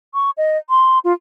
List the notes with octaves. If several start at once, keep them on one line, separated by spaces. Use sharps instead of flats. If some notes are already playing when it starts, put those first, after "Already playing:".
C#6
D#5
C6
F4